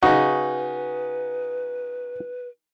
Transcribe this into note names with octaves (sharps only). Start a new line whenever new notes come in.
C#3 D#4 F#4 B4